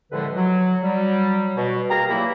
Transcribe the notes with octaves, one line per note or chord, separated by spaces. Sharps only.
C2 A2 D3 F3 G#3 B4
F#3
F#3 G3
B2
A#3 G4 G#4 A#4 A#5
A#2 E3 F#3 A#3 E4 G4